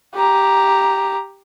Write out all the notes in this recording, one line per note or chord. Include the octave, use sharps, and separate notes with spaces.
G4 A#5